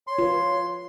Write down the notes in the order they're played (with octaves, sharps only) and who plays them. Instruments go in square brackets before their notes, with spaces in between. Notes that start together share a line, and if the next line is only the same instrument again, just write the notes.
[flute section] C#5 [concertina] C6
[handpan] F4 B4